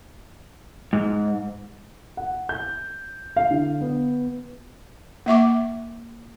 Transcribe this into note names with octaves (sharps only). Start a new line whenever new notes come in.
G#2
F#5
G6
F5
D3
B3
A#3 E5 C#6 D6